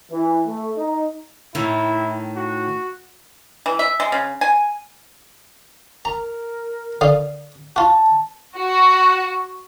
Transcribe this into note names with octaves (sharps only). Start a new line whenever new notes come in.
E3
A3
D#4
A2 D#3 E4
F#4
E3
E5
G#3
C#3
G#5
A#4 A#5
D3 F5 D#6
F4 F#4 A5
F#4